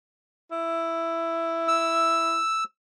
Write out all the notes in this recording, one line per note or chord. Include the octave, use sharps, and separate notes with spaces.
E4
E6